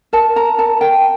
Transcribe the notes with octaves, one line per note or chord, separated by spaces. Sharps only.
A#4 A5
A#4 A#5
A#4 A5
A#4 G5